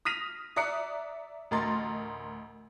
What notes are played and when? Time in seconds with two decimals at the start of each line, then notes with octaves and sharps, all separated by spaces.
0.05 D#6 F6 A#6 B6 D#7 F7
0.56 D5 E5 A#5 D#6 F#6 C#7
1.51 A1 D2 A#4 D#5 C6 A6